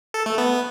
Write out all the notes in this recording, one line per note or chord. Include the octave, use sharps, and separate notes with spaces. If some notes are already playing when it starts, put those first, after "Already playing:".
A4
A3
B3